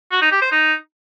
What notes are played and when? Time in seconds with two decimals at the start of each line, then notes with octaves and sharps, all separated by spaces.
0.11 F#4
0.22 D#4
0.32 G4
0.42 C5
0.52 D#4